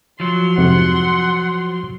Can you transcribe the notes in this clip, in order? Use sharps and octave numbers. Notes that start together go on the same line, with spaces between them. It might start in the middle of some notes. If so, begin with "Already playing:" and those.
F3 F#3 C6
F2 G#2 C3 F#5